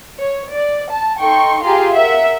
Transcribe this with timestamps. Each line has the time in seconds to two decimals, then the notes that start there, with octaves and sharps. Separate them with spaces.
0.21 C#5
0.54 D5
0.91 A5
1.20 D#4 A4 G5 C6 C#6
1.65 F4 G4 G#4 F5 A#5 C6
1.94 A#4 E5 F#5